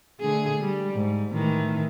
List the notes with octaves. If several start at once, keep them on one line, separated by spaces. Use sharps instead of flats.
D3 A3 G#4
G3
G#2
A2 D#3 E3